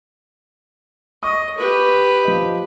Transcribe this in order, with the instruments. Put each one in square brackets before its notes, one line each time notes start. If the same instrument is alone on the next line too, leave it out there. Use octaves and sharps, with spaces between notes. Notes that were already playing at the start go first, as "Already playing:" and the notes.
[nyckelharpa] D#5 [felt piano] C#6 D#6
[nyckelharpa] G4 B4
[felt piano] F3 D#5